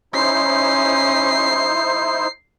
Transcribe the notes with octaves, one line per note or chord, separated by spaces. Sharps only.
C#4 D#4 E4 C5 C7